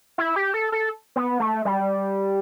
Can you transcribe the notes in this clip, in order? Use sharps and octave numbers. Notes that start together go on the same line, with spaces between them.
E4
G4
A4
A4
B3
A3
G3